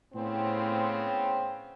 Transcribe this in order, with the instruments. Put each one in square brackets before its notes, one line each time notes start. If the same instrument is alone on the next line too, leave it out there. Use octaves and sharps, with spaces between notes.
[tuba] A2 [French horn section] C#3 B3 C4